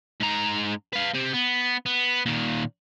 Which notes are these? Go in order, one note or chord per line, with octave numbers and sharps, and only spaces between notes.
G#2 A#5
B4 F5
C4 G4
B3
B3
A#2 D#3